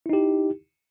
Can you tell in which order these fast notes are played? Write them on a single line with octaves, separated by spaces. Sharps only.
E4 D#4 G4